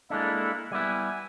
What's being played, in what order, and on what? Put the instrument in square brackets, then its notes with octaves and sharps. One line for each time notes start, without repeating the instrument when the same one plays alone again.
[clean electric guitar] G#3 D4 [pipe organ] A#3 E4 A4
[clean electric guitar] G3 B3 E4 [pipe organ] G#5